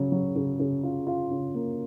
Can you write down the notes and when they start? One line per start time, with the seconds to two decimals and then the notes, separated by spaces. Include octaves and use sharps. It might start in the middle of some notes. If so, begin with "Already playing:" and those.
Already playing: C#3 F#3
0.12 F#3
0.36 C#3
0.60 C#3
0.83 F4
1.07 F4
1.31 C#3
1.55 A#3